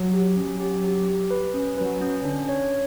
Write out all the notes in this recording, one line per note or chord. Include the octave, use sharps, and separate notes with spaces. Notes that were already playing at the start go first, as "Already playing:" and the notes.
Already playing: F#3
G4
F#3 C#4
G4
G4
G4
B4
C#4
F#3 B4
C#4
D3 D4
C#5